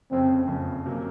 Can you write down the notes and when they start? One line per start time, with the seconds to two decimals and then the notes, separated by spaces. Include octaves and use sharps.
0.11 F#1 F2 C#3 C4
0.48 F#1 F2 C#3
0.86 C3 F#3 A#3